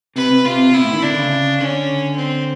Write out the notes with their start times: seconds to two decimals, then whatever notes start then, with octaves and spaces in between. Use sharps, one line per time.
0.16 C3 B4
0.31 C3
0.45 C3 F4
0.73 B2 E4
0.83 A2
0.92 D#3
1.02 D3 D4
1.17 C#3
1.60 D3 C#4
2.17 C4